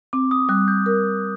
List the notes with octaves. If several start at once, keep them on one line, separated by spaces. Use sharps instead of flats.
C4 D6
D#6
G3 F#6
G6
A#4